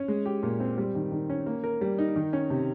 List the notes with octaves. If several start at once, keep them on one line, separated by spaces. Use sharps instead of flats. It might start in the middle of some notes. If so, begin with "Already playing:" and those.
Already playing: C#4
G#3
G4
A#2
C4
G3
D#3
D#3
C#4
A#3
A#4
G3
D#4
D#3
C#4
C3